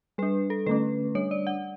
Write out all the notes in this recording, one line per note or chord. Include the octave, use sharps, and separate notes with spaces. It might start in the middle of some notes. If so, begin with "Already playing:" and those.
G3 D4 B4
A4
D3 A3 C#4 B4
G3 D4 C#5
D5
F#5